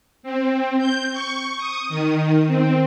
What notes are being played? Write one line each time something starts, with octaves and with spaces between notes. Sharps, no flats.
C4
G6
C#6
D#6
D#3
C4